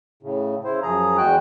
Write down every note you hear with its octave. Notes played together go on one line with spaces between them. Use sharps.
A2 C#3
C#3 E4 C5
F#2 F3 G#4 A#5
E2 G#3 F#4 G5 F#6